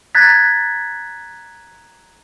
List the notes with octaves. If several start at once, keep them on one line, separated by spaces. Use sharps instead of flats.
A#5 F#6 G#6 A6 B6